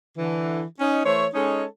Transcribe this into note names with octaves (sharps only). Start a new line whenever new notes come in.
D3 E3
C#4 D#4
E3 A3 C5 C#5
G#3 C#4 D#4 A4 C#5 D#5